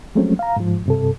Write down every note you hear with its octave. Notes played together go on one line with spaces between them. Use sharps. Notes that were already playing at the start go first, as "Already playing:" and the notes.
F3 F#3 G#3 A3 C4 C#4
F5 A#5
G#2 F3
G2 C3 A4